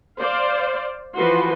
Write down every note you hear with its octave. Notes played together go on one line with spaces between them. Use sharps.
C5 D5 F5
E3 F3 F#4 B4 C6